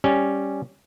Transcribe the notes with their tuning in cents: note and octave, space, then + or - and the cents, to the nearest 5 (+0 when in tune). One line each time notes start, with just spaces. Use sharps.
G3 +0 C#4 +0